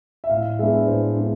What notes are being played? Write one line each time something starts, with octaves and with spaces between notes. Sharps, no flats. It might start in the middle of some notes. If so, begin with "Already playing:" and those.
E5
A2 F5
G#3 B3 D4 E5
A2 C5
G#3 B3 D4